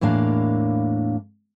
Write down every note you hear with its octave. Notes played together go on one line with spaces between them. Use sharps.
E2 A2 A#3 D4 F5